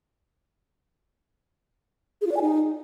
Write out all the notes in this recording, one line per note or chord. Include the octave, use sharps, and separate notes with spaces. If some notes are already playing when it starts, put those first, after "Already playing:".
G#4
F4
D5
G#5
D#4